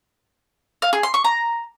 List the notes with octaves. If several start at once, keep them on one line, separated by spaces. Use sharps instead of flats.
F5
G#4
C6
C#6
A#5